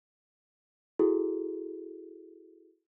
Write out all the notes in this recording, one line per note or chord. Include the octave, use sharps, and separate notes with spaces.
E4 F#4 G#4 A4